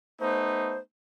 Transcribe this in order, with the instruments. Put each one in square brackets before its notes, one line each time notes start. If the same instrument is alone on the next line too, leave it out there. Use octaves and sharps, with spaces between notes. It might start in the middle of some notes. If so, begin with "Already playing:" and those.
[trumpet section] A3 B3 D#4 [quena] C5